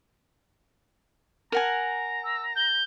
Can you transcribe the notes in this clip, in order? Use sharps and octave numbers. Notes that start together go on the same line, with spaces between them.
A#4 F#5 G#5 A#5
E6
G6